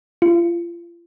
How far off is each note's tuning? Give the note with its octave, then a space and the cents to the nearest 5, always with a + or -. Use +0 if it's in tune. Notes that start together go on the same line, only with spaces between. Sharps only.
F4 -35